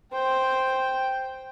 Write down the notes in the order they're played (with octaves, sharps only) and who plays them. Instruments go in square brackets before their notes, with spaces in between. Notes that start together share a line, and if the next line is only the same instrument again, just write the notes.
[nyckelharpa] C5 [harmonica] G5